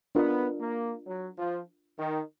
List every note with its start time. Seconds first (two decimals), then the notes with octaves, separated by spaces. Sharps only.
0.15 B3 D4 F4 A#4 D#5
0.60 A#3
1.07 F#3
1.38 F3
1.99 D#3